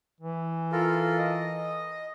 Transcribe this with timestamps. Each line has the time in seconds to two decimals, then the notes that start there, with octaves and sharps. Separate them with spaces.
0.20 E3
0.72 F4 A4 A#4
1.18 D#5